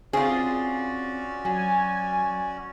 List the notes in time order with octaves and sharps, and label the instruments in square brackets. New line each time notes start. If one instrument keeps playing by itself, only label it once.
[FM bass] C4 [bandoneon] C#4 F#4 D5 [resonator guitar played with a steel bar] F4 G#4
[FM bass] F#3 [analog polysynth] G#5